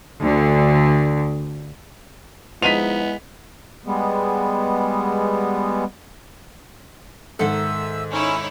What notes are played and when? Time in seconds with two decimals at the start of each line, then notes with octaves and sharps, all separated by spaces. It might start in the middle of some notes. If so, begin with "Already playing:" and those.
0.21 D2 D3
2.62 F3 G#3 B3 D#4 E4 B6 D#7 F7
3.86 G3 G#3 B3
7.39 G#2 D#3 A4 E5 F#5 E6
8.12 C#4 D#4 E4 C#5